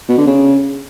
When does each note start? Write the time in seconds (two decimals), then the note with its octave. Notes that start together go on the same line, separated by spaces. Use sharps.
0.08 B2
0.18 D3
0.27 C#3